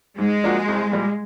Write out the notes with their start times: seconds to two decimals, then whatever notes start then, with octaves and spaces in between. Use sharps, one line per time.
0.18 G#2 G#3
0.44 F3 A#3 D4 F#4
0.68 C2
0.92 A#2 G3